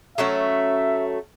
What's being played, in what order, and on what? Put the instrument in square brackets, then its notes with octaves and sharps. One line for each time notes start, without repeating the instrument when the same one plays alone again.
[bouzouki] F#3 A3 C#4 [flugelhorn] E5